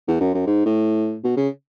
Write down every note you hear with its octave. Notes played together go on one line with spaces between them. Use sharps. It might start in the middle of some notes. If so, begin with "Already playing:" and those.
E2
F#2
F#2
G#2
A2
B2
C#3